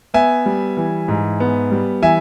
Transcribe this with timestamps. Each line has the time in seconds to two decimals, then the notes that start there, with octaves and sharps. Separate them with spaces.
0.14 B3 E5 G#5
0.46 G3
0.77 E3
1.08 G#2
1.40 B3
1.71 G3
2.02 E3 E5 G#5